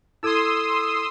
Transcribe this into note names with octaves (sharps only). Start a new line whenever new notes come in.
E4 A4 C6 D#6 E6 G#6